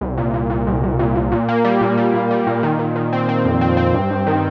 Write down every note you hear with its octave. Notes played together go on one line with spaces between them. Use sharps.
C2
A#2
A#2
A#2
C2
C2
A#2
A#2
A#2
A#3
G3
A#2
G3
A#2
G3
A#2
D#3
D#3
D#3
C4
C4
F2
C4
C4
G2
G2
D#3